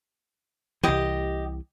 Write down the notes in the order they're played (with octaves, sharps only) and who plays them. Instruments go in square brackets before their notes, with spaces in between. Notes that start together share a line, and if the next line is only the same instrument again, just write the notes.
[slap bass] C2 E3 [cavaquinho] G4 D#5